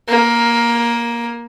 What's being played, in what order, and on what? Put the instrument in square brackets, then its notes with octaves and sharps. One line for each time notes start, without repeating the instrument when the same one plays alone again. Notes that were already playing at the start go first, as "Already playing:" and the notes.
[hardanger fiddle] A#3